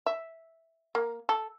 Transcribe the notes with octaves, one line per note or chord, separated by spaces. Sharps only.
E5
A#3
A4